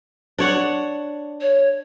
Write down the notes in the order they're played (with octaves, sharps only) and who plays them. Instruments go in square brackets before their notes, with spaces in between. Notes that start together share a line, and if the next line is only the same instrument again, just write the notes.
[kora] D4 C#5 F#5
[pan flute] C#5